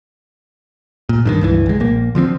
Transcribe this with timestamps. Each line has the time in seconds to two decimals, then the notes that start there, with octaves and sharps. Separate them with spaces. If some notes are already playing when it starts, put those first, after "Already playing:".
1.09 A#2
1.26 G2 D3 D#3
1.41 C#2 G2 E3
1.66 B1 G#3
1.80 A#1 A#3
2.15 D3 F3 G#3 C4